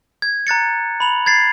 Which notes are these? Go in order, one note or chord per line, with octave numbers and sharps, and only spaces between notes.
G#6
A#5 F#6 A6 C#7
B5 F7 F#7
G#6 A6 C7